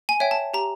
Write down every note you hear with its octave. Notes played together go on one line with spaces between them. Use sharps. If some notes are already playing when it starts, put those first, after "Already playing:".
G#5
C#5 E5 G5
A5
G4 A#5